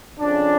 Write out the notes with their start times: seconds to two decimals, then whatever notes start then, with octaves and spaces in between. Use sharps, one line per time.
0.19 F2 C#3 F3 D4